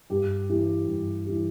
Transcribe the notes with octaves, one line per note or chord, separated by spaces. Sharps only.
G2 G4
E3 G3
G2
E3 G3